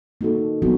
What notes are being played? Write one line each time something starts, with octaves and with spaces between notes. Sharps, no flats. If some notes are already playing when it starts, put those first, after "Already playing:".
A#3 D#4 F#4 A4
F#3 B3 D4 F#4